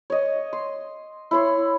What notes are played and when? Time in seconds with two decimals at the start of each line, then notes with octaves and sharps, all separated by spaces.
0.10 C#5 D#5
0.53 C6
1.31 E4 C#5 C6